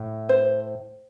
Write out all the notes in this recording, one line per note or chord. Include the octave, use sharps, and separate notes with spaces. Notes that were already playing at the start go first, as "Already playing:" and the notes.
Already playing: A2
C5